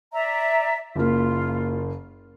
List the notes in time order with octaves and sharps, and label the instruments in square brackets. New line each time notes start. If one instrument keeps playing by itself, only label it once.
[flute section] D5 E5 A#5
[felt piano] F#1 A#3 [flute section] F4